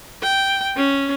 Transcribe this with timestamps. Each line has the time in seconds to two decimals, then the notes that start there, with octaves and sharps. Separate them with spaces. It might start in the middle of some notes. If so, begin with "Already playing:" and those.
0.23 G5
0.77 C#4